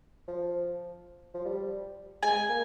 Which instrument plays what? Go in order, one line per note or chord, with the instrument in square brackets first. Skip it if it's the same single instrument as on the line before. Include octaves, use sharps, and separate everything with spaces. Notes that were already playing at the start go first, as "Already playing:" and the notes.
[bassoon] F3
F3
G3
[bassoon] G#3 [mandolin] G#5
[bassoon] A#3